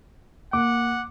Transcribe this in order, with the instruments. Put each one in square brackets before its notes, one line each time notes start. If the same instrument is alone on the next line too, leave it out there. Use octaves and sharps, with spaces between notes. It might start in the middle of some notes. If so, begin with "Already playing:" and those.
[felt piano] A#3 [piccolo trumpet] F#5 [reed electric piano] D6